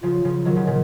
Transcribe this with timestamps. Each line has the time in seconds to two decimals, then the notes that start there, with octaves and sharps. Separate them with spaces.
0.03 C#3 F3 F4
0.25 C#3 F3
0.45 D#3 F#3
0.56 C#3 F3
0.67 A#2 C#3